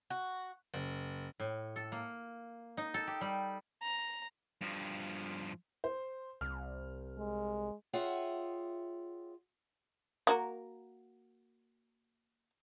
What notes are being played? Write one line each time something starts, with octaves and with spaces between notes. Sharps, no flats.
F#4
F#1
A2
A4
A#3
D#4
A4
G4
G3
A#5
G2 F3
C5
C2 F6
G#3
F4 G#4 C#5 E5 F#5 G5
A#3 F#4 A#4